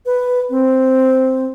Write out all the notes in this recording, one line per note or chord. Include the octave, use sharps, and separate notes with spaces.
B4
C4